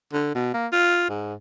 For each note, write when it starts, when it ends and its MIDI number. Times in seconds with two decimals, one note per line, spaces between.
0.13 0.33 50
0.35 0.51 47
0.54 0.67 58
0.72 1.05 65
1.10 1.34 44